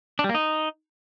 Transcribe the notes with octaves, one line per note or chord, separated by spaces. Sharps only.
D4
G3
A#3
D#4